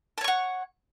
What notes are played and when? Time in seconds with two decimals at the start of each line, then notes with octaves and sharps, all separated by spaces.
0.18 A5
0.21 C#5
0.24 C#6
0.28 F#5